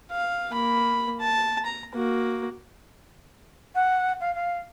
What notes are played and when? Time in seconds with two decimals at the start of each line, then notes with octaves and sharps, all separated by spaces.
0.11 F5
0.52 A#3 B5
1.20 A5
1.66 A#5
1.95 A#3 F#4
3.75 F#5
4.21 F5
4.35 F5